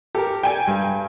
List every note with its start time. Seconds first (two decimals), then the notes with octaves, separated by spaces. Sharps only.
0.15 G4 A4 A#4
0.43 D5 G5 G#5
0.67 G2